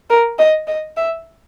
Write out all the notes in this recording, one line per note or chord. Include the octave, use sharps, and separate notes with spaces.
A#4
D#5
D#5
E5